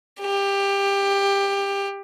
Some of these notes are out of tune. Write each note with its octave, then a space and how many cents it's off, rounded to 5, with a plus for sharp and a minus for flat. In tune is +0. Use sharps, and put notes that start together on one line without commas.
G4 +20